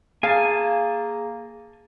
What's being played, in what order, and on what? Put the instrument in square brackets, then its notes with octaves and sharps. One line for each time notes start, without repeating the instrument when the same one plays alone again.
[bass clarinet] A#3 [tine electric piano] G#4 [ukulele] F5 [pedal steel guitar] G#5 A5